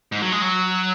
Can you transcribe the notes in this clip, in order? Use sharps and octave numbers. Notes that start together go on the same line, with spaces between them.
G#2
F#3
G#3
F#3